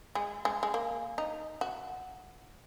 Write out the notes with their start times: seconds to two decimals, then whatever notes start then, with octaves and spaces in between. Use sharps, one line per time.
0.15 G#3
0.45 G#3
0.63 G#3
0.74 A#3
1.18 D#4
1.61 F#4